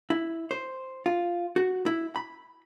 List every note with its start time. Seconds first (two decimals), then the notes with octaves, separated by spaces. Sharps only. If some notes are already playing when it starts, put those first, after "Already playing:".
0.10 E4
0.51 C5
1.06 F4
1.56 F#4
1.86 E4
2.16 B5